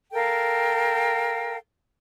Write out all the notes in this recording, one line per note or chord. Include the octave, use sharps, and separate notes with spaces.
A4 A#4 F5 G5